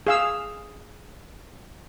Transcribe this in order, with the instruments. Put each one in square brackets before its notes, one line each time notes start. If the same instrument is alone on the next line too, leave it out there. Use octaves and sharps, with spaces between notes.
[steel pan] G#4 F5 E6